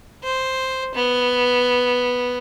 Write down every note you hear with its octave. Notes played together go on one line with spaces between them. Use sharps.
C5
B3